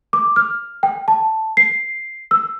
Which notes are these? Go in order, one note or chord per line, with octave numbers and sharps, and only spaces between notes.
D6
F6
G5
A5
C7
E6